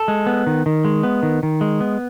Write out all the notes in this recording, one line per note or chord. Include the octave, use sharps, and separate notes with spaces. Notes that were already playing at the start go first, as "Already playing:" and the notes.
Already playing: A4
G#3
B3
D#3
D#3
G#3
B3
D#3
D#3
G#3
B3